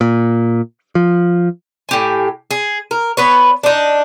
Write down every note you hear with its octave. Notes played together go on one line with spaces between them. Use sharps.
A#2
F3
A2 G4 G#5
G#4
A#4
B3 B4 C#5
D4 D#4